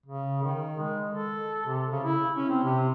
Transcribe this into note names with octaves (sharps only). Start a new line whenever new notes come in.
C#3
D#3
G#3
A4
C3
C#3
E4
C#4
C4
C3